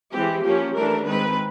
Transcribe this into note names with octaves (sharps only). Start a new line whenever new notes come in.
E3 G#3 C4 G4
F3 A#3 C#4 G4
E3 A3 D4 A#4
D#3 G#3 C4 B4